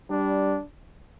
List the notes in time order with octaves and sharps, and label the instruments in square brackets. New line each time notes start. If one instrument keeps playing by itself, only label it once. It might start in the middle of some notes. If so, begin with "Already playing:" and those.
[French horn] G3 [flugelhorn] D4